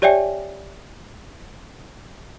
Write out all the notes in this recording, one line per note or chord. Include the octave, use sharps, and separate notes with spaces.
G4 C#5 D5 E5 G5 G#5